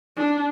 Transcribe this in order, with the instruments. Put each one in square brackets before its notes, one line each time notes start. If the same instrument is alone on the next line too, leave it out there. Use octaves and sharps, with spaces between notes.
[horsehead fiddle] D4